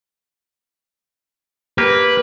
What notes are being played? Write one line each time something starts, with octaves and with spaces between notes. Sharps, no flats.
A#3 G4 B4